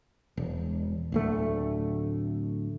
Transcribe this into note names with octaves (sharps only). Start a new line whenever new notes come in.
E1
D1 D2 A3